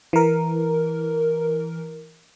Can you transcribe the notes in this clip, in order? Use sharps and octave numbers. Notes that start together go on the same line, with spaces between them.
E3 A#4